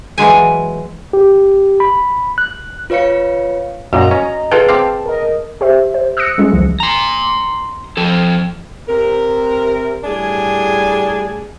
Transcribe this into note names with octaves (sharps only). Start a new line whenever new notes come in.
E3 F#3 G#3 G#5
G4
B5
F#6
F4 B4 C#5 F5 C#7
F#2 A#2 F#4 D#5 A#5
C#4
F4 G#4 A4 B4 G5 A5
C4 F5 G5 D6
A#4 D#5
G4 C5 E5
C5
D#6 E6 F#6 A#6 C#7
G3 G#3 C#4 F4
C#2 E3 F3 G#3
A#5 C6
F3 A4
C3 A#4
A2 G3 D4 G#4 G#5